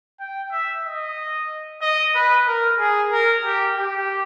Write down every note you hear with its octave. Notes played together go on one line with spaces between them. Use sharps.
G5
E5
D#5
D#5
B4
A#4
G#4
A#4
G4
G4